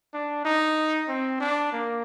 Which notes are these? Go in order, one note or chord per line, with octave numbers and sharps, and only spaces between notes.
D4
D#4
C4
D4
A#3